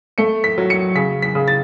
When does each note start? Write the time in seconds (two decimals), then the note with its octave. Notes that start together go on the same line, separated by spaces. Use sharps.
0.18 A3 C#7
0.44 B6
0.58 F#3
0.70 C#7
0.95 C#3 B6
1.22 B6
1.35 C#3
1.48 A6